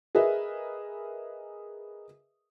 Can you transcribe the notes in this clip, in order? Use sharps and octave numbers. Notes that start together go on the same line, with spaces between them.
G#4 A#4 B4 D#5 E5